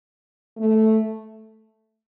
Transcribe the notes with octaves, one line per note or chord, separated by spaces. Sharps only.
A3